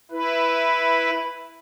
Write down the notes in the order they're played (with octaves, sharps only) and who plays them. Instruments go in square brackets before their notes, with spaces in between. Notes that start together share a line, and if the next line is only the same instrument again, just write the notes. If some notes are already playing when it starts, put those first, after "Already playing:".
[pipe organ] E4 B4